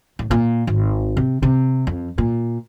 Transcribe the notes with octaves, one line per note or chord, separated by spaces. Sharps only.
A2
A#2
G#1
C3
C3
F2
A#2